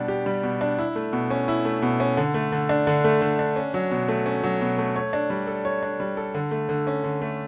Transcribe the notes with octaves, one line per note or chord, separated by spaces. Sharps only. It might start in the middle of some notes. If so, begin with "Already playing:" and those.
Already playing: B2 G3 D4
G4
G3
B2
D4
E4
A3
B2
C#4
E4
A3
B2
C#4
D3
A3
D3
D4
D3
A3
D3
D4
C#4
F#3
B2
A3
C#4
F#3
B2
A3
C#5
D4
G3
A4
C#5
D4
G3
A4
D3
A3
D3
C#4
D3
A3